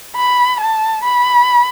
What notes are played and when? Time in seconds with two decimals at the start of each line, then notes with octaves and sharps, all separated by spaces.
0.16 B5
0.60 A5
1.04 B5